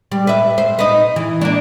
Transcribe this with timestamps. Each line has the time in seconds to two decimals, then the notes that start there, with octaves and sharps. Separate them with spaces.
0.12 G3
0.27 B4 E5
0.58 C5
0.79 D#4 B4
1.16 E3
1.41 A#3 D4